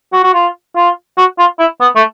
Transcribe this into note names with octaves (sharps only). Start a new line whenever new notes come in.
F#4
F#4
F4
F4
F#4
F4
E4
B3
A3